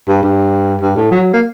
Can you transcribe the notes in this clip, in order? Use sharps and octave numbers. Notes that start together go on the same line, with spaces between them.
G2
G2
G2
A2
F#3
A#3